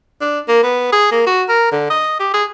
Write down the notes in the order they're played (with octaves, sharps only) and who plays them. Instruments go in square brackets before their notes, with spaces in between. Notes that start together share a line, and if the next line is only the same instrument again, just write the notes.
[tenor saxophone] D4
A#3
B3
G#4
A#3
F#4
A#4
D3
D#5
G4
G#4